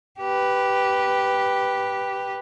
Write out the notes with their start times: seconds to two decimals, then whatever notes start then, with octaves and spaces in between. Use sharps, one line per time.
0.20 G4 B4